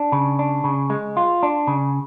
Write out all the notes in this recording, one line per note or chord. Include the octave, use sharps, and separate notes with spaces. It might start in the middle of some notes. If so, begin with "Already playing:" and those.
Already playing: D4
C#3
D4
C#3
G#3
F4
D4
C#3